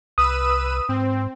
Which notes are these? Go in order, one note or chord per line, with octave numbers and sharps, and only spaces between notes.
C2 B4 D#6 E6 D#7
G#2 C4